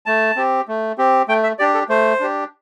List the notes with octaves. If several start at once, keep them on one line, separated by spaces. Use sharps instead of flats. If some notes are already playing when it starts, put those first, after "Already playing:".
A3 A5
C4 G4
A3
C4 G4
A3 G5
E5
D4 G4 D5
A4
A3 C5
D4 G4